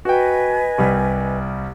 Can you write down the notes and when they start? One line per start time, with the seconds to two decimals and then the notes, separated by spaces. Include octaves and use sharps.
0.05 F#4 B4 D#5 G5 G#5
0.78 C2 G3